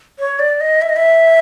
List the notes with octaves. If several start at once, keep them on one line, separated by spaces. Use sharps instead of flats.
C#5
D5
D#5
E5
D#5
E5